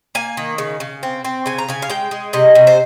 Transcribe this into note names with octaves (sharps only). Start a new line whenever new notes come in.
A#3 G#5
D#3
C#3
C#3
C4
C4
C#3 G#5
A#5
C#3 G#5
F5
G#3 G5
G#3
C3 D#5
C3
C5